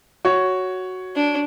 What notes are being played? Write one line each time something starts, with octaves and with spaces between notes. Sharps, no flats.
F#4 C#5
D4